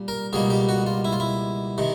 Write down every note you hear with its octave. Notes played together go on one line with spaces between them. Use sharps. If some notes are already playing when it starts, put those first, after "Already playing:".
Already playing: A#2 G3
A#4
C#2 B2 G3 A#3 G#4
G4
F#4
F4
E4
F4
E4
C3 D#3